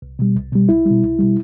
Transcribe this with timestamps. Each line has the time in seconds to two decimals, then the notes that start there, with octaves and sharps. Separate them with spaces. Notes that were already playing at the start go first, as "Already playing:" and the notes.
0.02 C2
0.19 B2 G3
0.35 C2
0.52 B2 G3
0.69 C2 E4
0.86 B2 G3
1.03 C2
1.19 B2 G3